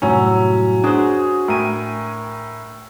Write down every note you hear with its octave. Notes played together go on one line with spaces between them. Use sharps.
C2 F#2 A2 F#3 C#4 E6
D4 F#4 G#4 C5
A2 A#4 G5 G#5 D#7